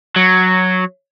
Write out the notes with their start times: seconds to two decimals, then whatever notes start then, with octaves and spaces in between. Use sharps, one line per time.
0.16 F#3